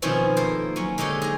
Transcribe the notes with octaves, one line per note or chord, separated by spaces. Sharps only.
B2 D#3 F3 C4 C#4 E4
A#3 A4 C5
F#3 C#4
D3 G#3 D#4 G4 C#5
G#4 D#5